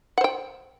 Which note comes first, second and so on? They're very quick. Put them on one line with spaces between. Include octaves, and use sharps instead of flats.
F#5 C5 G5